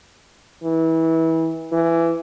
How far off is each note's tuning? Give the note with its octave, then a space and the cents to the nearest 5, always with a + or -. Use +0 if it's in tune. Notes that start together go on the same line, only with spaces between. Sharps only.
E3 -25
E3 +15